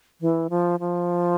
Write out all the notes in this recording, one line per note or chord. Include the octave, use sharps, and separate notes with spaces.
E3
F3
F3